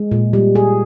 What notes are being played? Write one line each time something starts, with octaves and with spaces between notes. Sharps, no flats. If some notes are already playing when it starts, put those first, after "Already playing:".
Already playing: G#3
A#2
G3
G#4